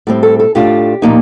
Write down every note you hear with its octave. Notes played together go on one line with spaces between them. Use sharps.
A2 G3 C4
A4
A4
A2 A3 D4 F4 G4
A#2 F3 A#3 D#4